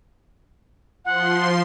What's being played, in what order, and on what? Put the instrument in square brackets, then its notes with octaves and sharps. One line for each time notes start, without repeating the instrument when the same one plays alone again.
[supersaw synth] F3 C6 [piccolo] F#5